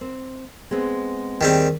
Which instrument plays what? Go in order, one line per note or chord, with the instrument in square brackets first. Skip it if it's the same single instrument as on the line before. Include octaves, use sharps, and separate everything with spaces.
[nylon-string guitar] C4
G#3 B3 C4
[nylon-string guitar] D#2 G#4 G5 [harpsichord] D#3 G3 C4